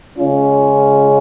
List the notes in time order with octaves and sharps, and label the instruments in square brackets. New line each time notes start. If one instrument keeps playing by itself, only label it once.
[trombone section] C#3 G#3 C#4 F4